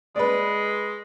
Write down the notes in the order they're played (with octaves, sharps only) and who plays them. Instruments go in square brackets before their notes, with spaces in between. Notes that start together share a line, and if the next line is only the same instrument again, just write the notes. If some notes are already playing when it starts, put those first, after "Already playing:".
[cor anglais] G#3 [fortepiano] B4 D5